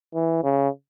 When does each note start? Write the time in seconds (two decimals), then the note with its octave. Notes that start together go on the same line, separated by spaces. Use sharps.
0.14 E3
0.43 C#3